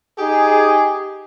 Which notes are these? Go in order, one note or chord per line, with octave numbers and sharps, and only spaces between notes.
D#4 G4 G#4